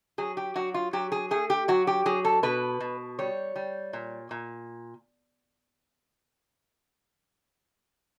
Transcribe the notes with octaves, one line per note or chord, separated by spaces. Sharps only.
F#3 G#4
G4
F#3 F#4
F4
F#3 G4
G#4
A3 G#4
G4
F#3 F#4
G4
F#3 G#4
A4
B2 B4
B2
G3 C#5
G3
A#2
A#2